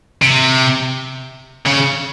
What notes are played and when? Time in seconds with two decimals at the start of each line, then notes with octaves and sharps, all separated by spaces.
0.22 C3
1.66 C#3